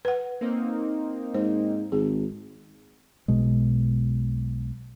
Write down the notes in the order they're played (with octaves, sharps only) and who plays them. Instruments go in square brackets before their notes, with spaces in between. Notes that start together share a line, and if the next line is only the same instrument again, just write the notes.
[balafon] B4 F#5
[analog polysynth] A#3 C4 D#4
[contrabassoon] G#2 [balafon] C5
[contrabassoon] G#1 [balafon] G#4
[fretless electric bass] B1 B2 G#3